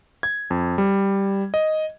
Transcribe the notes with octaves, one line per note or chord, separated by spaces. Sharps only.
G#6
F2
G3
D#5